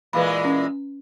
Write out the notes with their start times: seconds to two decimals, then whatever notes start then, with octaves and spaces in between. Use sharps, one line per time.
0.13 A#2 E3 G#3 B4 F5 B5
0.45 C#4